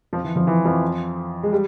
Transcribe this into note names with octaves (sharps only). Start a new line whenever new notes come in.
F2 F3
E3
F2 F3
E3
F2 F3
G#3
G3